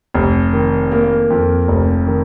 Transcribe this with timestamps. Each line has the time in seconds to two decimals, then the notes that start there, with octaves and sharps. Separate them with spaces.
0.14 F1
0.53 D#3
0.91 A#3
1.30 F2
1.68 F1
2.07 D#3